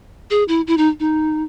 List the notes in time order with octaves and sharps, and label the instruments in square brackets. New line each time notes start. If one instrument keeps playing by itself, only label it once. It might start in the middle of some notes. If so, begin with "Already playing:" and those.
[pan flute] G#4
E4
E4
D#4
D#4